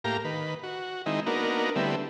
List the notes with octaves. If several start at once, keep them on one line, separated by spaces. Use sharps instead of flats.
A2 A#3 G4 F5 A#5
D#3 B4
F#4
D#3 G#3 C4 D#4 E4
A#3 B3 D4 D#4 F#4 A#4
D3 G3 A3 B3 C4 E4